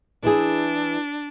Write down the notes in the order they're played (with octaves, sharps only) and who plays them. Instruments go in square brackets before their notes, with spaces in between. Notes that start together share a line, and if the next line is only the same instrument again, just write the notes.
[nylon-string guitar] E3 E4 G#4 [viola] D4